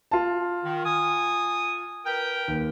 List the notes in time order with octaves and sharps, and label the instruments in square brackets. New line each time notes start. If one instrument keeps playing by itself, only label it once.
[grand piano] F4 A5
[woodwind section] D#3
G#5 D#6
A#4 B4 G5
[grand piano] D#2